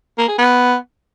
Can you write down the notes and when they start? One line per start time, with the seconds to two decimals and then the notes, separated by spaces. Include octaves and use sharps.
0.18 A#3
0.28 G#4
0.38 B3